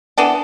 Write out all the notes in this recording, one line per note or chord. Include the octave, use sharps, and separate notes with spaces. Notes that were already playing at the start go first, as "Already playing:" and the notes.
E3 B3 D4 A4